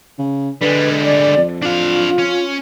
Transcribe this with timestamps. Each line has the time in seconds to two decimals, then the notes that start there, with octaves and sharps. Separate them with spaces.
0.18 C#3
0.61 D3 G3 G#3 B4
1.04 D5
1.37 F2
1.62 D4 F4 F5
2.18 C#4